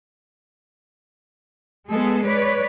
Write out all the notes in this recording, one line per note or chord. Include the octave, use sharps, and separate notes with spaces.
G#3 B3 G#4 A4
B4 C#5 D5